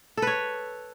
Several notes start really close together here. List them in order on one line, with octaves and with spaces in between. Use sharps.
A4 B4 C#5